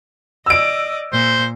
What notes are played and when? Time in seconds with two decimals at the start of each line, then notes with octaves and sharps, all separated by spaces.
0.46 D5 D#5 E6 D7
1.12 A#2 C5